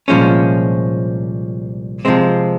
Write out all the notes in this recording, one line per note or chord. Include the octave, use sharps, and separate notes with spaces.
C2 A#2 F3 G#3 C#4
C3 F3 G#3 C4